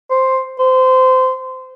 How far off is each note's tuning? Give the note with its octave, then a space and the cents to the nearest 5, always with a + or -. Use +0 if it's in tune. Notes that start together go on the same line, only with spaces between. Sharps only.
C5 +5
C5 -25